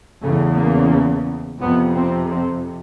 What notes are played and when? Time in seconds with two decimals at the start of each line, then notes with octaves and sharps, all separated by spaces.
0.23 E2 C#3 A3
0.58 A#3
1.61 F2 C3 B3
1.96 C4
2.30 C4